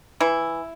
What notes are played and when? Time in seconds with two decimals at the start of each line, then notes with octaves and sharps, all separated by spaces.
0.20 E3 E4